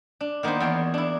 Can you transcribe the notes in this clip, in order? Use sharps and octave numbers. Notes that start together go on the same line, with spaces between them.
D4
D#3 A#3 B3 D4 C5
E2 C#5 G5 A#5 C6
D4 E4